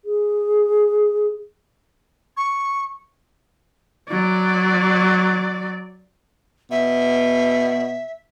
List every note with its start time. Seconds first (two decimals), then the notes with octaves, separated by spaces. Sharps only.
0.05 G#4
2.37 C#6
4.10 F#3 D5
6.71 B2 E5